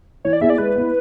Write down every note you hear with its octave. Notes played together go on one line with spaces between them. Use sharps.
E3 C#5
D5
B3 E4 G#4 E5
D5
G#3 B4
B3 E4